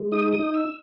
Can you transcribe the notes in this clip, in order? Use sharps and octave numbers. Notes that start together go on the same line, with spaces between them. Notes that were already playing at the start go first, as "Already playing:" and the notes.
Already playing: G#3
D#4 D#6
D#6
D#4
E6